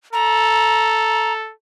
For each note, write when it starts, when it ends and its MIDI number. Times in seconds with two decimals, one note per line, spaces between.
0.13 1.53 69
0.13 1.33 82